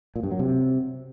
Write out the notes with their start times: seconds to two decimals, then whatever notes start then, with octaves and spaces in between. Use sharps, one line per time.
0.16 A#2
0.23 G2
0.31 F#3
0.39 C3